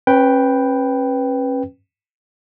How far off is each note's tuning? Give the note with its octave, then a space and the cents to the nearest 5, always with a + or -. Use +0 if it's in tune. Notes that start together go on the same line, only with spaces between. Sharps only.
C#4 -35 B4 +0 G5 +0